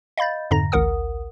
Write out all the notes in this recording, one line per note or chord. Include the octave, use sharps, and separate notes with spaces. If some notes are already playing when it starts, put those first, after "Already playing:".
D#5 F5 B5 G6 A6
F2 G#2 D3 A#5 A#6
A1 D2 A#4 F#5 D#6